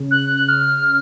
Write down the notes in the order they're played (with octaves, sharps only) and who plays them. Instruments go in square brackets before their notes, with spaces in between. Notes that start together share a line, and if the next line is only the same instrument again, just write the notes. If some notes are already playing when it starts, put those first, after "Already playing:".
Already playing: [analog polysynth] C#3
[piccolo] F#6
F6